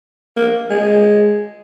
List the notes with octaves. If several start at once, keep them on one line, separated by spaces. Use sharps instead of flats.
A#3
G#3